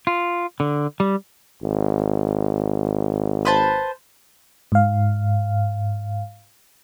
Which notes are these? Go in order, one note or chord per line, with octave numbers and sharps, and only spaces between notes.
F4
D3
G3
G#1
B4 C5 A5
G#2 F5